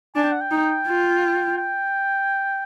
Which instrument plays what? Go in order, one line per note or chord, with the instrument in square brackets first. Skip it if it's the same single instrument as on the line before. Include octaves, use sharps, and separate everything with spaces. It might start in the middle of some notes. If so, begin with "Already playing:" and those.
[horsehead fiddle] D4 [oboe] G#5
[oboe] G5
F#5
G5
[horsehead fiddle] D#4
F4
[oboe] G5